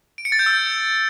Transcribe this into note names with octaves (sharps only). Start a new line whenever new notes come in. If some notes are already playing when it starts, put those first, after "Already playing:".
D7
C#7
A6
G6
E6